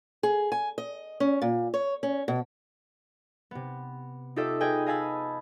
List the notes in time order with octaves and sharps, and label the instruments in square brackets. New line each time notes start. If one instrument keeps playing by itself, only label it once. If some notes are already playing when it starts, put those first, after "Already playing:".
[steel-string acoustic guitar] G#4
G#5
D#5
C#4
A#2
C#5
C#4
B2
[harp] C3 B3
D#4 F4 G4 A4 D#5 E5
G#4 B4 D#5 G5 G#5
D#5 F5 G#5 A5 B5 E6